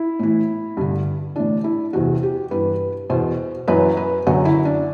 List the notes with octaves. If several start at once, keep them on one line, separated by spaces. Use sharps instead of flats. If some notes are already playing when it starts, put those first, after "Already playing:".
Already playing: E4
A2 E3
G2 D3
A2 E3 D4
E4
E2 C3 E3 F#4
G4
G2 E3 B4
E2 B2 C5
F#2 E3 B4
B4
F#2 D3 F#4
E4
D4